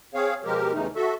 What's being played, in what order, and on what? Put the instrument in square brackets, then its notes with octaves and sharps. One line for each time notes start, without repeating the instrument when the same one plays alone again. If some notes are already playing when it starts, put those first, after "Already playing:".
[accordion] C4 G#4 C#5 F5
B2 F3 G#3 G4 A#4
E2 C#3 E3 A3 D#4
F#4 A4 E5